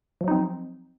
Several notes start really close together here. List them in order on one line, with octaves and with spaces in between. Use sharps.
F3 F#3 D#4 C4